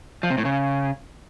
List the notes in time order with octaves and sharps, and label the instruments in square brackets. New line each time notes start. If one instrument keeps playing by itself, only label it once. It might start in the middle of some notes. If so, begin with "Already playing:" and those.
[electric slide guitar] F3
C3
A2
C#3